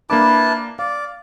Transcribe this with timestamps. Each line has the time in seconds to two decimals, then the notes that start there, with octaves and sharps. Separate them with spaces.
0.10 A#3 D4 E4 B4 A5 D6
0.79 D5 F5